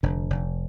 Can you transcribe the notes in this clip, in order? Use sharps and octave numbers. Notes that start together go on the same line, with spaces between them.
F1 D3
F1